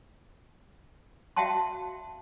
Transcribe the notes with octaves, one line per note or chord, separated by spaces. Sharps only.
F#4 E5 F5 G5 A5 C6